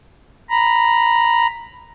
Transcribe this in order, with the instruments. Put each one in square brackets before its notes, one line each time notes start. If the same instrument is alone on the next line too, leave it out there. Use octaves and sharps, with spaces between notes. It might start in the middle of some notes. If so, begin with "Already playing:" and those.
[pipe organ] A#5 B5